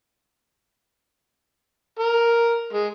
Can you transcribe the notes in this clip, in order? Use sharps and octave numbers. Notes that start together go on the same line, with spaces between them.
A#4
G#3